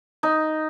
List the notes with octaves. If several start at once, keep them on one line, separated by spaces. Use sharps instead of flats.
D#4